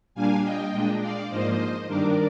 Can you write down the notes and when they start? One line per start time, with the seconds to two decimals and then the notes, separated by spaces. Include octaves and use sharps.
0.15 A#2 G3 A#3 D4 F5 G#5
0.43 D#5 G5
0.72 A#2 G#3 D4
1.01 D5 F5
1.30 G#2 F3 A#3 C5 D#5
1.88 G2 D#3 G3 D4 A#4 D5